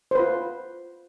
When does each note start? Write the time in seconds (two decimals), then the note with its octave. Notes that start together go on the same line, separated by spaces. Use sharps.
0.11 C5
0.15 B4
0.19 F4